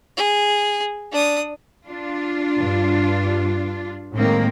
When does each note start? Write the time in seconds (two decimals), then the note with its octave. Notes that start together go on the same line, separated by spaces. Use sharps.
0.17 G#4
1.12 D4 D#6
1.86 D4 F4
2.58 G2
4.15 A2 D#3 G#3 A#3 C4